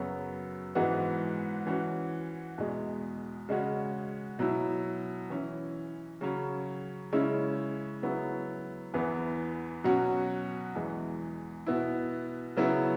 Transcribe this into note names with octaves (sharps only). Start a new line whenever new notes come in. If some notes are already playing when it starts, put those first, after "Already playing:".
Already playing: F#2 C#3 F#3 B3
G#2 E3 G#3 B3 F#4
E3 C#4 F#4
E2 B2 G#3
C#3 G#3 C#4 F#4
B2 F#3 E4
E3 C#4 E4
C#3 F#3 C#4
C#3 G#3 C#4 E4
C#3 F#3 B3 E4
E2 E3 B3
B2 F#3 C#4 F#4
E2 E3 G#3
B2 B3 E4
C#3 F#3 B3 E4